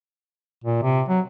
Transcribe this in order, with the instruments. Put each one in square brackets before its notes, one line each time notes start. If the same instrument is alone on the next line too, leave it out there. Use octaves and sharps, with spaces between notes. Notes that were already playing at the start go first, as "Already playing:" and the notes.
[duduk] A#2
C3
F#3